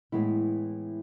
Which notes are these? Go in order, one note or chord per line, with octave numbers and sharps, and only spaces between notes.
A2 E3 G#3 B3 E4